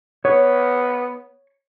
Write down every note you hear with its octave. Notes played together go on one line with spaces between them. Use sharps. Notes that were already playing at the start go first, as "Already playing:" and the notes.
B3 C#5